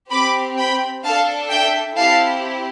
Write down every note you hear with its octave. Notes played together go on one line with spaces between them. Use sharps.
C4 G4 B5 D6
G5 B5
D4 A4 F5 A5
E5 G5
C4 E4 G4 F5 A5